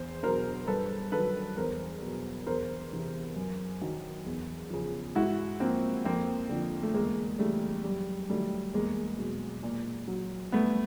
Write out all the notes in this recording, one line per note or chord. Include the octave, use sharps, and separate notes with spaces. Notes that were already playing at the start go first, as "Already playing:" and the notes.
Already playing: E2 C5
B2 F#3 A#4 C5
G2 A4 B4
D#3 F#3 A4 B4
E2 A#4 C5
B2 F#3
E2 A#4 C5
C3 E3
F#2
D#3 F#3
E2
C#3 F3
G#2 E4 F#4
F3 A#3 C4
F2 A#3 C4
D3 F3
A3
E2 G#3 A#3
C#3 E3 G3 A3
F#2 G3
D#3 F#3 G3 A3
E2 G#3 A#3
B2 F#3
A#2
F#3
G2 A3 B3